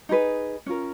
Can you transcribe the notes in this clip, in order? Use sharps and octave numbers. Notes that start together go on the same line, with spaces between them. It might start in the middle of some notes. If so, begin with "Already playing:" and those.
D#4 G#4 B4
C#4 F4 A#4